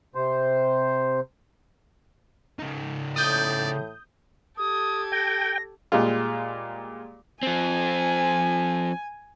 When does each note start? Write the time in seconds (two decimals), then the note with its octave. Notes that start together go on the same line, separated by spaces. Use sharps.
0.15 C3 C5
2.59 C#3 D#4
3.16 A2 D5 D#6 G6
4.58 G4 A4 D#6 G#6
5.12 G5 A#6
5.92 A#2 G3 G#3 F4
7.43 F3 C4 G#5